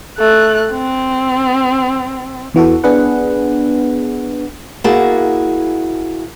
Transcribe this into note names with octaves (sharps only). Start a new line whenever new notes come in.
A3 F#6
C4
E2 E3 F#4 A4
B3 D4 G#4 B4 F#5
A#3 E4 F#4 G#4 A5